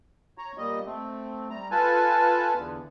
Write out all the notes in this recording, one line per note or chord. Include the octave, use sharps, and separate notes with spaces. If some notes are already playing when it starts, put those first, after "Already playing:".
C#5 A#5
A#2 G3 D#5
A3 C4
G3 A#5
F4 A4 B4 G#5 A5
E2 D3